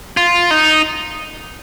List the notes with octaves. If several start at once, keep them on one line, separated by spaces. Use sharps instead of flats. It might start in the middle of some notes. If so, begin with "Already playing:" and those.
F4
D#4